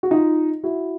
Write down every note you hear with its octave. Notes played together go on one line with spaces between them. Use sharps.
F#4
D#4 F4
E4 F#4